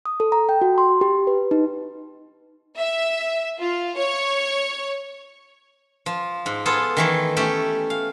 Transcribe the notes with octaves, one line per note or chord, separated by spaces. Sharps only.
D#6
A4
A#5
G5
F#4
C6
G4
B4
D#4
E5
F4
C#5
F3
G#2
B3 F4 G#4 A4
D#3 E3 A3
A3 C#4 G4 A4
F5